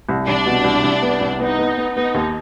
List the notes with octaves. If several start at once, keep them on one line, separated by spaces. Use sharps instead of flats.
C2
C2 D4
B2
C2
C2
B3
C2
B3 D#4
B3
B3
B3 D#4
D#2